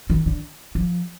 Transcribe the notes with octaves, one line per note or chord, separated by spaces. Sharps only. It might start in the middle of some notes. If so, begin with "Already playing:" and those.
D#3
D3
F3